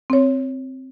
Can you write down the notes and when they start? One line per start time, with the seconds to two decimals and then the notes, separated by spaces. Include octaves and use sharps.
0.10 C4 C#5